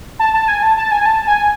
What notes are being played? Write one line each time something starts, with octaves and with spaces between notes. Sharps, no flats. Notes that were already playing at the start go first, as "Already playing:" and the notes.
A5
A5
G#5
A5
A5
G#5
A5
G#5